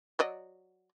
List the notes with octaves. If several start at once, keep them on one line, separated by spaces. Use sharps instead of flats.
F#3 D5 D#5